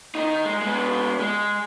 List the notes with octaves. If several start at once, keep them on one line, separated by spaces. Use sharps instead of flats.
D#3 D#4
G#3
G#3 B3
G#3